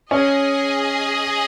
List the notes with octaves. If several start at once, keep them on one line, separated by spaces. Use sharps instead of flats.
C#4 G#4 D#5 G#5